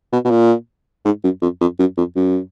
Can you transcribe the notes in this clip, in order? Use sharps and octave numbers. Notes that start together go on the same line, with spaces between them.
B2
B2
A#2
G#2
F#2
F2
F2
F#2
F2
F#2